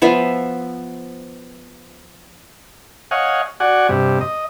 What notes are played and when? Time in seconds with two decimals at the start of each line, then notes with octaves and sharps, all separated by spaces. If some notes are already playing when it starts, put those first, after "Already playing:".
0.02 F3 B3 F4 E5
3.11 C#5 D#5 F5 F#5 G#5
3.60 F#4 D5 F#5 G#5
3.89 G2 C3
4.21 D#5